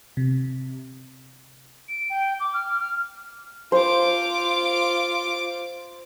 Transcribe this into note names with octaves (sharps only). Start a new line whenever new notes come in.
C3
D7
G5
D6
F6
F6
F4 C5 D6